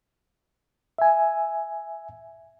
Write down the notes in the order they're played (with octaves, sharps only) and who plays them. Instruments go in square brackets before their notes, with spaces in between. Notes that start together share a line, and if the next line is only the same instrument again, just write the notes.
[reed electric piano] E5 G#5